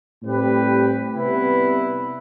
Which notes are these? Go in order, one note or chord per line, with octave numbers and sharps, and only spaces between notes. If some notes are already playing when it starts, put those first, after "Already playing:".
A2 G3 C4 G4 B4
C3 G3 B3 E4 B4